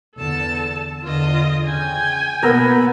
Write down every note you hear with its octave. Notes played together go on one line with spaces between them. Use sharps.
E2 D3 A4 A5
E2 D3 F4 D#5
C#3 G5 G#5
B2 A#3 B3 A#4 E6